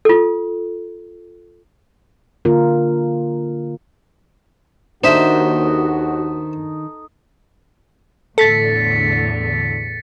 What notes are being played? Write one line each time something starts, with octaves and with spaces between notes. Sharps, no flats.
F4 A4
D3 A#3 F4 A#4
D#2 D#3 D4 D#4 F#4 A4 C5 E5
E2 A2 D3 A4 A6 B6 C#7